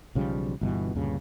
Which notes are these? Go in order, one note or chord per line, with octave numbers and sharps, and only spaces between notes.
B1 C#3 F3 G3
G1 G2 B2 E3
D2 G2 A#2 C#3